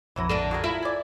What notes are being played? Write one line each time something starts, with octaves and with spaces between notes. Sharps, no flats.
A#1 F2 E3 F#3 E4 A#6
D3 D4 A4
F#4 G#4 A#4
E4 F4
D5 G#5